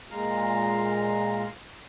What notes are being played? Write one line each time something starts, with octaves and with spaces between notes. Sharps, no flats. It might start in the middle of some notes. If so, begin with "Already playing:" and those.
A#2 G#3 F5 A#5